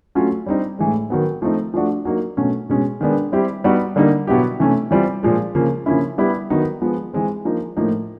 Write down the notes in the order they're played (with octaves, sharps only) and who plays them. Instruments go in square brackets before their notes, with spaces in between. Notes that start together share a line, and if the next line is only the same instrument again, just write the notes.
[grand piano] F#3 A3 C#4 F4
G3 C4 D#4
A2 E3 G#3
D#3 F#3 B3
F3 A3 C4 D#4
F3 A3 D4 F#4
F#3 A#3 D#4
B2 F#3 A3 C#4
B2 G#3 C#4
D#3 G#3 B3 D4
G3 C4 E4 G4
G3 B3 D#4 F#4
D3 G3 A#3 D#4
B2 F#3 B3 E4 G4
C3 E3 A3 C#4
E3 G3 C4 F4
A#2 F3 G#3
C#3 F3 A#3
C#3 F3 A#3 C#4 E4
G3 B3 E4 G4
D#3 F#3 B3 D#4
F3 G#3 B3
E3 G#3 C4
F3 A#3 D#4
A2 F3 A#3 D#4